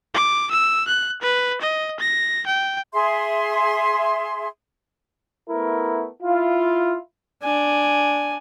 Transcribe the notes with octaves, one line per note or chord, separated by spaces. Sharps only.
D6
E6
F#6
B4
D#5
A#6
G5
G#4 E5 C6
A3 B3 E4 A#4
E4 F4
D4 G#5